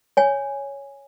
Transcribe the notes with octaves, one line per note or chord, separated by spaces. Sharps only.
C#5 G#5